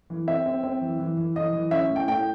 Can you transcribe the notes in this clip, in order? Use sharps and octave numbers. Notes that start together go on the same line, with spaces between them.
E3
C4 E5
C4
C4
E3
E3
E3
E3 D#5
E3
C#4 E5
A2
G5
A2 G5